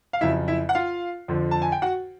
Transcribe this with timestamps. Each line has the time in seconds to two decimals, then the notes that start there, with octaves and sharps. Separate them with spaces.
0.13 F5
0.21 F2 C#3 F#3 E4 E5
0.48 E4 E5
0.69 F#5
0.75 F4 F5
1.28 F2 D3 F3
1.51 A5
1.62 G#5
1.72 G5
1.82 F#4 F#5